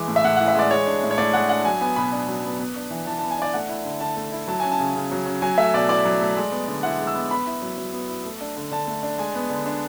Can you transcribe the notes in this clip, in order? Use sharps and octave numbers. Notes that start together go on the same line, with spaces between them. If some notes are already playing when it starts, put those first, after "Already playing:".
Already playing: E3 G#3 D6
A2
E5
A2 F#5
F#5
E3
E5
G#3 D5
G#3 C#5
D4
A2
C#5
A2 D5
G#3 F#5
D4 F#5
F#3 G#5
B3 G#5
B2 B5
D4
F#3
B3
B3
D4
E3
E3 A5
A5
B3
G#5
D4 D5
A3 F#5
E4
D3
D3 A5
A3
E4
F#3 A5
C#4 G#5
A5
C#3
C#3
F#3
C#4
F#3 G#5
A3 E5
B2 D5
E4 D5
F#3
A3
G#3
B3
D3
E4 F#5
G#3
E6
B3
B3 B5
E4
F#3
F#3
B3
E4
A3
D4
D3
D3 A5
A3
D4
G#3 G#5
B3
D3
D4